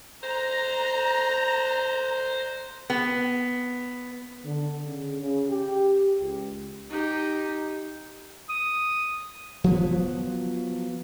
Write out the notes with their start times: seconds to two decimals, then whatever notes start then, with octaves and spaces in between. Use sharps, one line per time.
0.23 C5 A#5
2.90 B3
4.44 D3
4.86 C#3
5.20 C#3
5.49 G4
6.20 C#2
6.90 D#4 G4
8.49 D#6
9.64 F3 F#3 B3